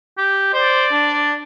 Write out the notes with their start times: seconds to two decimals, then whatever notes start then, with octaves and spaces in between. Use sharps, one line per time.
0.18 G4
0.53 C5 D5
0.92 D4